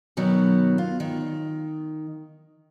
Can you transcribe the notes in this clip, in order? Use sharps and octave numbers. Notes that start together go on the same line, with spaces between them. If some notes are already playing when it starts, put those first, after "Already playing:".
B2 D#3 F#3 B3
F4
D#3